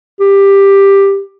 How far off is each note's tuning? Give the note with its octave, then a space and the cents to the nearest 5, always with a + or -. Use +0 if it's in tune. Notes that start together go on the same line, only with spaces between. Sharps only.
G4 +10